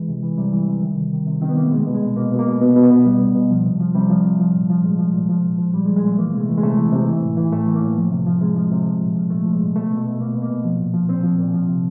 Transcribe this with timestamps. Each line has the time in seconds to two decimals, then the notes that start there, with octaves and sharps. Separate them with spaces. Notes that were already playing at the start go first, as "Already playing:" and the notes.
Already playing: E3 G#3
0.08 C3
0.23 E3
0.37 C3 G3
0.53 E3
0.68 C3
0.82 D#3
0.97 C3
1.13 D#3
1.27 C3
1.41 D#3 C4
1.49 B3
1.56 C3 A#3
1.64 A3
1.71 B2 G#3
1.87 B2
1.94 G#3
2.02 B2
2.16 B2 A#3
2.32 B2
2.39 A#3
2.46 B2
2.61 B2 B3
2.76 B2
2.83 B3
2.91 B2
3.06 B2 G3
3.21 B2
3.35 B2
3.51 F3
3.65 C3
3.80 F3
3.95 C3 G3
4.10 F3
4.25 C3
4.39 F3
4.55 A#2
4.70 F3
4.84 A#2 G#3
4.99 F3
5.14 A#2
5.29 F3
5.43 A#2
5.58 F3
5.74 A#2 G3
5.85 G#3
5.89 F3
5.96 G#3
6.03 A#2 A3
6.18 E3 A#3
6.33 C3 G#3
6.41 A3
6.48 E3
6.57 G#3
6.63 C3 A3
6.78 E3
6.93 C3
7.08 E3
7.22 A2
7.37 E3
7.52 A2 A3
7.67 E3
7.74 A#3
7.81 A2
7.97 F3
8.11 C3
8.26 F3
8.41 C3 G#3
8.56 F3
8.71 C3
8.86 F3
9.01 A#2
9.16 F3
9.30 A#2 A3
9.45 F3
9.53 G#3
9.60 A#2
9.75 B2 A3
9.90 B2
9.97 A3
10.05 B2
10.20 B2 A#3
10.35 B2
10.42 A#3
10.50 B2
10.64 F3
10.79 A#2
10.94 F3
11.09 A#2 C4
11.24 F3
11.38 A#2
11.54 F3
11.68 C3